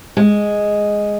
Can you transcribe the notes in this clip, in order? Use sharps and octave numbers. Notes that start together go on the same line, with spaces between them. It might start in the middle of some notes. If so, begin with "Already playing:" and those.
G#3